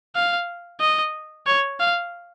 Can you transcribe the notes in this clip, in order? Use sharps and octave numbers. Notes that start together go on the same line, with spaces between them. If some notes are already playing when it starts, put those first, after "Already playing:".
F5
D#5
C#5
F5